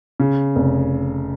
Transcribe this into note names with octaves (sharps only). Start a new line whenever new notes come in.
C#3
F1